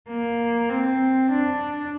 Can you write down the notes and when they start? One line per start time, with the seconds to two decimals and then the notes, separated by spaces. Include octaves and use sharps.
0.09 A#3
0.70 C4
1.31 D4